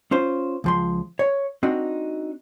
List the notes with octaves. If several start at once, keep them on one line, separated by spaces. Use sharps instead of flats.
C#4 F4 C5
C#2 F3 C6
C#5
C4 D4 D#4 F#4